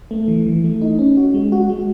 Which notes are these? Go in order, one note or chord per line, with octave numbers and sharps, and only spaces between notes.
A3
E3
E3
A3
D#4
C#4
F#4
G#3
F#4
G#3